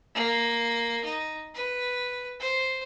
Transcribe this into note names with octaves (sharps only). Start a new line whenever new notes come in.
A#3
D#4
B4
C5